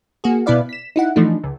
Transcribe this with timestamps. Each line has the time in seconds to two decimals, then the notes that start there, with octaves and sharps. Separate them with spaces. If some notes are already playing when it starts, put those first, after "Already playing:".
0.24 A#3 F#4 G#4
0.46 B2 B3 E4 B4 D5 F5
0.69 B6 E7
0.96 D#4 E4 F#5
1.16 E3 F3 A3 D4 D#4
1.44 C#2